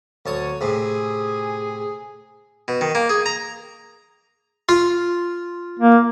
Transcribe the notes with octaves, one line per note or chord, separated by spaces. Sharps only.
D2 F#3 C#5 A5 D#6
A2 C3 G#4
B2
D#3
A#3
G#4
A#5
F4
A#3